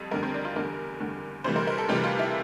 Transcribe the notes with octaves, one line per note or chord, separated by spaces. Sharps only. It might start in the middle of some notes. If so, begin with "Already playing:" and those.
Already playing: F2 G3
F2 D3 G3 A#4
C4
D4
F4
E2 D3 G3 A#4
E2 D3 G3
D2 C3 E3 G3 C5
A#4
A#4
A4
D2 C3 E3 G3 G4
F4
E4